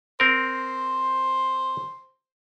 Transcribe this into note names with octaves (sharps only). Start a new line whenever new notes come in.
C4 A#4 C5